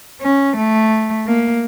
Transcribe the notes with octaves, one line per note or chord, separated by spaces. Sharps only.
C#4
A3
A#3